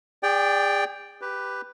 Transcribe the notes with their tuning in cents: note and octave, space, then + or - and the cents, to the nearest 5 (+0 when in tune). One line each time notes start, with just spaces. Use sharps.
G#4 -35 D5 +0 G5 +0
G4 +0 B4 +5